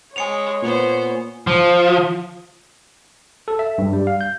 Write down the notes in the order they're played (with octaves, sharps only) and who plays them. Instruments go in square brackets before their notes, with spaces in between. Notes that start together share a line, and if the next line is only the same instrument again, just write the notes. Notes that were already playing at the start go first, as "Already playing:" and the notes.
[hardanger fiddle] G#3 [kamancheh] C#5 [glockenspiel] G#5 C#7 F7
[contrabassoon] A#2 [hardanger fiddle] B3 C5
[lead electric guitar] F3
[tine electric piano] A4
E5
G2
G3
F5
G6